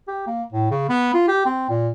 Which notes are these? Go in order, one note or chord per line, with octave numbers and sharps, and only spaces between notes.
G4
A#3
A2
C#3
B3
F4
G4
C4
A#2